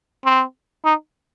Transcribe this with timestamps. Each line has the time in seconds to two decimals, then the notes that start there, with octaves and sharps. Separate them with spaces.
0.25 C4
0.85 D#4